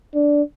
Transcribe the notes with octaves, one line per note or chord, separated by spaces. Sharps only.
D4